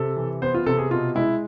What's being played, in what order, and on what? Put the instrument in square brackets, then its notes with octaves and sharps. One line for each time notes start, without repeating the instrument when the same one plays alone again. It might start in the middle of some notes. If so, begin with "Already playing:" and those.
Already playing: [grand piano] C3 A4
E3
B3 C5
F4
C3 A4
G#4
B2 F4
G#3 E4